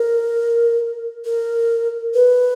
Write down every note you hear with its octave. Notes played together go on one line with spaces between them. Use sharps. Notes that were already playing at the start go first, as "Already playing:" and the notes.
Already playing: A#4
A#4
B4